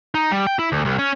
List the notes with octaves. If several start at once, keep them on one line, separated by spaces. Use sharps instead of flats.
D#4
G3
G5
E4
D2
C2
C#4